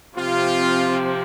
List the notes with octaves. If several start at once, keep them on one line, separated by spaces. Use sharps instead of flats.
C3 F3 C4 F4